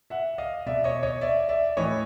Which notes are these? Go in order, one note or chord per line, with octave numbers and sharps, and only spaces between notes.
E5 F#5
D#5 F5
B2 D5 E5
C#5 D#5
C#5 D#5
D5 E5
D5 E5
A2 E3 C#5 D#5